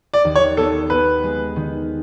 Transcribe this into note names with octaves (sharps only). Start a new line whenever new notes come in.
D5
D#2
C#5
B3 A4
B3 B4
G#3
D#3